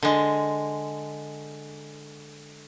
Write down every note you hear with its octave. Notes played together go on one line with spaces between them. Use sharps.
D3 G#3